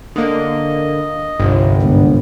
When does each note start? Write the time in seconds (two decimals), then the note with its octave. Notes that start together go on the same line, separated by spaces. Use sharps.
0.16 D3 A#3 D#5
1.39 G1 C2
1.83 G#2 D3 B3